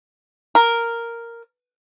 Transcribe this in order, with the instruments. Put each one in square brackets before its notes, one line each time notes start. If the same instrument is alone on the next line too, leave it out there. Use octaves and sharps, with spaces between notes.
[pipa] A#4